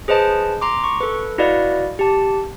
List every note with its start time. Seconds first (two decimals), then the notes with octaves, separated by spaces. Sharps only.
0.08 G#4 B4 C5 D#5 A5
0.61 A#5 C6 D6
0.84 C#6
1.01 A4 B4
1.38 E4 F#4 B4 D5 D#5 F5
1.99 G4 A5